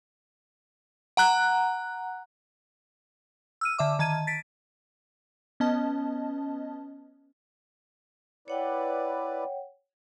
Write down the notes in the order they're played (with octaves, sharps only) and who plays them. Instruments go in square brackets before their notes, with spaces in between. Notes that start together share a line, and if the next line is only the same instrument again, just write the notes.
[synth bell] F#5 A#5 F#6
E6 F6 D#7
D3 E5 D6
D#3 A5 G#6 D#7
A6 B6 D7
[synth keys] B3 C#4 D#5 A5
[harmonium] E4 B4 D5 [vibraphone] C#5 F#5 G5